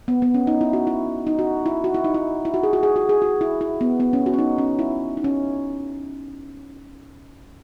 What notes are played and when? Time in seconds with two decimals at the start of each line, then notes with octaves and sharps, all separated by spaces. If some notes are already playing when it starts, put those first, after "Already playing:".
0.08 B3
0.22 B3
0.34 C#4
0.47 D#4
0.61 E4
0.73 F#4
0.87 E4
1.27 D#4
1.39 F#4
1.66 E4
1.84 F#4
1.94 E4
2.04 D#4
2.14 E4
2.45 E4
2.54 F#4
2.63 G#4
2.73 F#4
2.83 G#4
2.96 F#4
3.09 G#4
3.22 F#4
3.41 E4
3.61 E4
3.81 B3
4.00 B3
4.13 C#4
4.26 F#4
4.34 C#4
4.38 D#4
4.58 C#4
4.79 E4
5.17 D#4
5.24 C#4